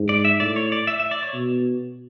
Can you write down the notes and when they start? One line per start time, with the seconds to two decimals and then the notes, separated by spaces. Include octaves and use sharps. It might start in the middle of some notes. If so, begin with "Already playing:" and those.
Already playing: G#2
0.09 D5
0.25 E5
0.40 A2 D5
0.56 C#5
0.72 D5
0.87 E5
1.00 E5
1.11 D5
1.23 C#5
1.34 B2